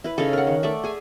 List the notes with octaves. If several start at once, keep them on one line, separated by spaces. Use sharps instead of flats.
E4 B4
C#3 C#4 D#4 A4
A#4 F#5
D#3
A3 D5 E5
G#4 G#5